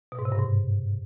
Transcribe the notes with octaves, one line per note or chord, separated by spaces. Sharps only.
B2
G#2
C3
G2
G#2